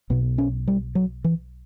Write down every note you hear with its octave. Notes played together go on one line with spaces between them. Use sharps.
B1 B2 B3
C#4
G3
F#3
E3